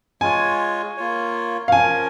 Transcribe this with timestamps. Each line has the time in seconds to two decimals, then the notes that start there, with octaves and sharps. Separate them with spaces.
0.21 G#3 F4 C#5 G#5
0.97 A#3 F4 C#5
1.68 F5
1.72 F3 C#4 A#4 G#5